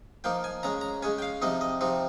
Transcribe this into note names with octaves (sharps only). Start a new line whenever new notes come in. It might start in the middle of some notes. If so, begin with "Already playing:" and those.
F3 A#3 D#4 G5
G#5
C#3 G#3 C#4 A#5
A#5
C#3 G#3 C#4 G#5
G5
F5
C3 F3 C4 D#4 D#5
D#5
C3 F3 C4 D#4